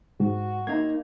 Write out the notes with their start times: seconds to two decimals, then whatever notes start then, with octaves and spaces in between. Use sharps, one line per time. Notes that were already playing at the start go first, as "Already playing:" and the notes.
0.20 G#2 F#4
0.67 A#3 D#4 G#6